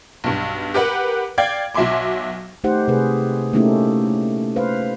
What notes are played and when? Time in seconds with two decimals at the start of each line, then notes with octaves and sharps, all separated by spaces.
0.24 B1 G2
0.74 G4 A#4 B4 F#5
1.38 D5 F5 G5 G#6
1.75 B1 F#3 E5 G#5 C6 D6
2.64 A3 D#4 G4 C5 F#5
2.88 C3 A3 G#4 B4
3.53 A3 A#3 C#4 D#4 E4 G4
4.56 B4 C5 F5